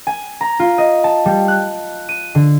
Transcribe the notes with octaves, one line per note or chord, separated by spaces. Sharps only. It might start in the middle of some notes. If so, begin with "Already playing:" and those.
G#5
A#5
F4
D#5
A5
G3
F#6
D#7
D3